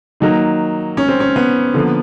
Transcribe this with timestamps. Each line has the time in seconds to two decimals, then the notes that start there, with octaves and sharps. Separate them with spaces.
0.20 D#3 F#3 A#3 D#4
0.97 C#4
1.08 C4
1.20 C#4
1.36 B3
1.74 D3 F3 A#3